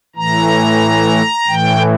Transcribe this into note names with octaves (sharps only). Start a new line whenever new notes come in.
A2 E3 A#5
A2 E3 G5